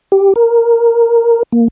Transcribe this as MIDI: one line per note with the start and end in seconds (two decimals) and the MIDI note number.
0.12 0.33 67
0.36 1.43 70
1.52 1.68 58